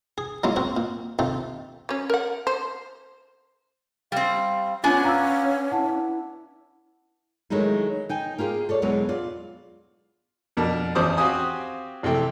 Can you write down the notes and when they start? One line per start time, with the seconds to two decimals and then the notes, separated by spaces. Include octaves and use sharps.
0.18 G#4
0.44 F#3 G#3 A#3 C#4 E4 F4
0.56 C4 F#4 A#4
0.77 A#2
1.19 C3 D#3 F4 A4
1.89 F#3 C#4
2.10 A#4 F#5
2.47 C5
4.12 G3 C4 F5
4.84 B3 C#4 D4 F4 G#5
5.04 F5 A#5 D6 E6
5.72 E4 F#5 A5
7.50 D#3 F#3 G#3 A3 D#4 E4
8.09 D#4 G5 G#5
8.38 A#3 F4 G4 G#4
8.69 A4 C#5 D5
8.82 E2 B2 E3 F#3 G#3 B3
9.09 F4 D5
10.57 F2 B2 D4 A#4
10.95 A1 E2 C#4 C5 D6 D#6
11.17 C4 F#4 G4 F5 G#5 D#6
12.03 A#1 C3 E3 A3 G5